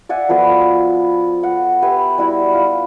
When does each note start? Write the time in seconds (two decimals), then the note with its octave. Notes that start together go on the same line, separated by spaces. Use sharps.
0.09 D5 E5 F#5 G#5
0.29 F3 B3 F#4 A4
1.43 F#5
1.82 G4 B4 E5 G#5
2.18 G3 E4 F#4
2.54 F4